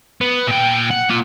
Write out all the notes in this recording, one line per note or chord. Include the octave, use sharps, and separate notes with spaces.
B3
A#2 G5
F#5
A#3 F4